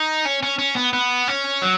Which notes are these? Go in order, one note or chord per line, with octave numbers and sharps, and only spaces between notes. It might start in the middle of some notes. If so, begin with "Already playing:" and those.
Already playing: D#4
C#4
C#4
C#4
B3
B3
C#4
F#3